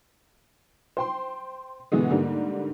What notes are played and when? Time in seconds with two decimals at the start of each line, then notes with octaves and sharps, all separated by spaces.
0.97 C5 G5 C6
1.92 G2 B2 D3 E3 G#3 B3
2.10 G#2 D3 G3 A#3